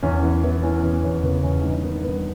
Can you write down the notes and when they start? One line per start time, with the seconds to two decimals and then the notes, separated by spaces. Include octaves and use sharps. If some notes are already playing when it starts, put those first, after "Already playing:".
0.03 E2 C#4
0.23 E3 B3
0.43 E3 B3
0.63 E3 C#4
0.83 E2 B3
1.03 E2 C#4
1.23 C#3 B3
1.43 E2 C#4
1.64 G2 D#4
1.84 D#3 B3
2.04 G2 B3